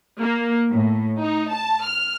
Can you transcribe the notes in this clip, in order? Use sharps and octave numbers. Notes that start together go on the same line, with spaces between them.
A#3
A2
D#4
A5
F6